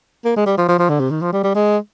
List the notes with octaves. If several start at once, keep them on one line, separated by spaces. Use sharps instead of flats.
A#3
G#3
G3
F3
F3
F3
D3
C3
D#3
F3
G3
G3
G#3